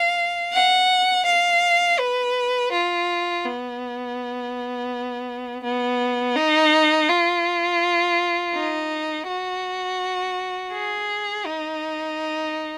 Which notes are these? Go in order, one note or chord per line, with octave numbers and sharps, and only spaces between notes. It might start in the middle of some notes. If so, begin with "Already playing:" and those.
Already playing: F5
F#5
F5
B4
F4
B3
B3
D#4
F4
D#4
F#4
G#4
D#4